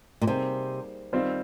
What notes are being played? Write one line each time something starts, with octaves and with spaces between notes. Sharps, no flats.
A#2
C3 G3 A#3 D#4 G#4 C5
D#3 G3 C4 F4 C5